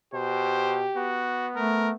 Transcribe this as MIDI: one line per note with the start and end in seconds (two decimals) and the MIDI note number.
0.14 0.86 47
0.14 1.25 67
0.14 0.78 72
0.97 1.95 59
0.97 1.48 66
1.56 1.92 57
1.56 1.90 70